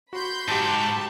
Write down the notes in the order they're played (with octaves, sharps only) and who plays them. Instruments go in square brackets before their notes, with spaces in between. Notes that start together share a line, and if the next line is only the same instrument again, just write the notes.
[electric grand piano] F#4 [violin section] B5 C6 G6
[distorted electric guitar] G#2 [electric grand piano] F#4 G4 [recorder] A5